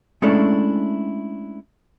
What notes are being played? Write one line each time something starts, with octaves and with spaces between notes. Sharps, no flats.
G#3 A3 C#4 D4 E4 A4